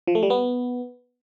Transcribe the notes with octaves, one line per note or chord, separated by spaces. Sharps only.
F3
A3
G3
B3